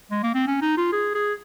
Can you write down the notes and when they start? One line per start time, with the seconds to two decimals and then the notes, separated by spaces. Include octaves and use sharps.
0.11 G#3
0.23 A#3
0.34 C4
0.47 C#4
0.62 D#4
0.77 F4
0.93 G#4
1.15 G#4